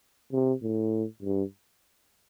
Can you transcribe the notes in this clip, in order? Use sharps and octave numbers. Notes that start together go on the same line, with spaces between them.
C3
A2
G2